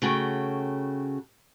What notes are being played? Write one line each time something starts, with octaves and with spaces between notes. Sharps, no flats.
C#3 A3 F#4 G5